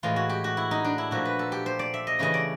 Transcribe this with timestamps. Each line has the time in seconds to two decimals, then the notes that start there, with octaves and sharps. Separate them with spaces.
0.03 A2 E3 G#3 F4
0.16 F#4
0.29 G4
0.44 F#4
0.57 E4
0.71 D#4
0.84 D4
0.98 E4
1.11 A#2 F3 A3 F#4
1.25 B4
1.39 A4
1.52 G4
1.66 C5
1.79 D5
1.94 E5
2.07 D#5
2.19 C#3 E3 A3 D#5
2.34 D5